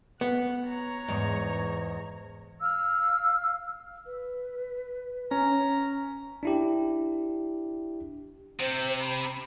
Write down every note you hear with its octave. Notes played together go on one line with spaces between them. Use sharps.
B3 F#5
C#5 A#5
E2 G#2
F5 E6 F6
B4
C#4 A#5
D4 E4 G4
C3 C5
B5